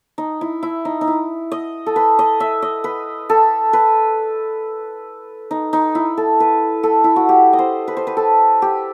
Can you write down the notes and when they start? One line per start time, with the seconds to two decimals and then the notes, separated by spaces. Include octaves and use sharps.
0.18 D#4
0.41 E4
0.63 E4
0.85 D#4
1.01 D#4
1.07 E4
1.52 D#5
1.86 A4
1.96 B4
2.19 D#5
2.40 E5
2.62 D#5
2.84 B4
3.29 A4
3.73 B4
5.51 D#4
5.73 D#4
5.95 E4
6.17 A4
6.40 B4
6.83 A4
7.04 E4
7.16 F#4
7.29 G4
7.53 D#5
7.59 C5
7.88 B4
7.97 C5
8.07 B4
8.17 A4
8.62 G4